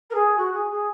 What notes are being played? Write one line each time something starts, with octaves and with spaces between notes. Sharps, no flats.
A#4
G#4
F#4
G#4
G#4